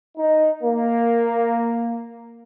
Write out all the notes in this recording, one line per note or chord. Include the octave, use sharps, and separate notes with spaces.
D#4
A#3